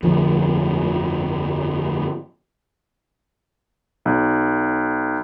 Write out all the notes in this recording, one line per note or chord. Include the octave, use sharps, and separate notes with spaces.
G1 F2 D3 F3
B1